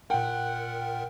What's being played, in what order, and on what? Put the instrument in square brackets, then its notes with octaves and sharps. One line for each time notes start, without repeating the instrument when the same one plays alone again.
[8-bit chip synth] A#2 A#4 [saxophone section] F#5 [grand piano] G5